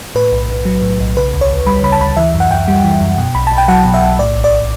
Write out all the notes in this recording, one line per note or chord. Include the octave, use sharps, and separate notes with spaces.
A2 B4
B1
B1
F#3
A2
B1
C#3 B4
D2
C#5
D2
G3 B5
C#3 B5
A5
D2 B5
E3 E5
F#2
F#5
F#2 G5
G3
E3
F#2
B2
B1 B5
B1 A5
G5
F#3 F#5
B2
E5
B1
A2 D5
A1
D5